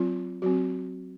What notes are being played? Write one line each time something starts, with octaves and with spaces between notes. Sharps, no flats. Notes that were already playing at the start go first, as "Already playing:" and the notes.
Already playing: F#3 C4 F4
F#3 C4 F#4